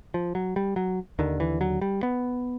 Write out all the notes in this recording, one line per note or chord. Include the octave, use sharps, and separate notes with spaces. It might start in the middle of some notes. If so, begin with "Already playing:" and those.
F3
F#3
G3
F#3
D#2 D3 D#3
E3
F#3
G3
B3